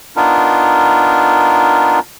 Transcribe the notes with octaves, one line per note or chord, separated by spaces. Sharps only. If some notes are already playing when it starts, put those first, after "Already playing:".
B3 D4 D#4 F4 A#4